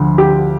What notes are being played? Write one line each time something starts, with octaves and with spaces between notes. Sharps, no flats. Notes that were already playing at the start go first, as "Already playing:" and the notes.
Already playing: D2 D3 F3
G4